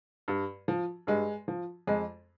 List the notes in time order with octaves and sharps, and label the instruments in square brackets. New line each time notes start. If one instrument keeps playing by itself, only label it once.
[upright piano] G2
F3
G2 G#3
F3
F2 G#3